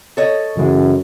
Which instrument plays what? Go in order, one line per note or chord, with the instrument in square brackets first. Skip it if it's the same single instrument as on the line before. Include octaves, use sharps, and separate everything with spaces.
[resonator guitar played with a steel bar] A4 C#5 D#5
[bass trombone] F#2 [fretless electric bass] C#3 E3 G#3